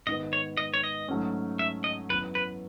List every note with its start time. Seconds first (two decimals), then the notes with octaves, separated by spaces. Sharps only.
0.07 G#2 D#3 G#3 B3 D#5
0.33 C#5
0.57 D#5
0.74 C#5
0.84 D#5
1.08 G#2 F#3 A3 C#4
1.59 E5
1.84 D#5
2.09 F#2 E3 B3 B4
2.35 B4